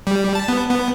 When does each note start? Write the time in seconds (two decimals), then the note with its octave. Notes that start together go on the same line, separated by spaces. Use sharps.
0.07 G3
0.35 A5
0.48 B3
0.71 B3